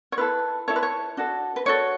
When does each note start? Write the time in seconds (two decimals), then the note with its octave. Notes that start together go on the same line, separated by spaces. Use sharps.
0.12 C#5
0.18 E4 A4 B4
0.68 E4 A4 C#5
0.76 B4
0.83 C#5
1.17 D4 F#4 A4
1.56 B4
1.65 D4 F#4 A4 C#5